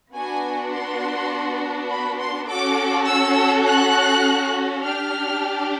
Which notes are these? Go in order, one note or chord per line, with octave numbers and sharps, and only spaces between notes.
B3 D4 F#4 G#5
C6
B5
C6
C#4 F#4 A4 D6
E6
F#6
D4 G4 F6